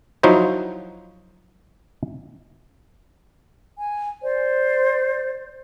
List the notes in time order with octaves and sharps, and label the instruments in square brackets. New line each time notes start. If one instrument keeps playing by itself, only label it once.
[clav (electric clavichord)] F3 F#3 D#4 E4 F#4 C5
[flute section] G#5
C5 D5